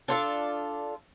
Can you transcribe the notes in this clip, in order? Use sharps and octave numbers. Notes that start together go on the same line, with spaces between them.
D4 F4 A4